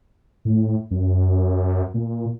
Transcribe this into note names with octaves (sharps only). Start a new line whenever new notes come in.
A2
F#2
A#2